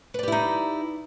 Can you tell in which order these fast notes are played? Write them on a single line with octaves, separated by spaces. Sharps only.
B4 D5 G4 E4 D#4